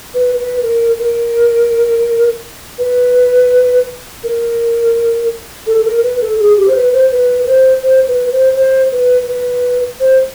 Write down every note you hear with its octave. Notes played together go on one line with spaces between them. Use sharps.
B4
B4
A#4
A#4
B4
A#4
A4
A4
A#4
B4
A4
G#4
G4
C5
B4
C5
B4
B4
C5
C5
B4
C5
C5
B4
B4
C5